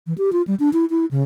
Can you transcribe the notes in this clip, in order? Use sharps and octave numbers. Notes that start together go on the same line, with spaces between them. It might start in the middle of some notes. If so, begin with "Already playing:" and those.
E3
G4
F4
G3
D4
E4
E4
C#3